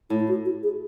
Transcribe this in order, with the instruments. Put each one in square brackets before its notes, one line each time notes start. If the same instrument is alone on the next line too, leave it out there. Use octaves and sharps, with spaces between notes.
[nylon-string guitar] A2 [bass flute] E4
[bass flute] E4
F#4
F#4
G#4